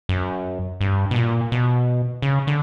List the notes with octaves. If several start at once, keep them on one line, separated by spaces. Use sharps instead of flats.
F#2
G2
B2
A#2
B2
C#3
D3